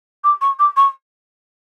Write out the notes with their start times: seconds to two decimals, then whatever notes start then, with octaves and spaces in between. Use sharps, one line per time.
0.23 D6
0.41 C#6
0.59 D6
0.76 C#6